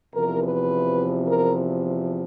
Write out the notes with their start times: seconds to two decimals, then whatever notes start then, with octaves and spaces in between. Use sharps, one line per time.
0.13 E2 C3 F3 A#4
0.41 B4
1.27 A#4